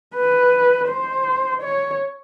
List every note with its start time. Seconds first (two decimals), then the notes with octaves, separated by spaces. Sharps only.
0.15 B4
0.88 C5
1.62 C#5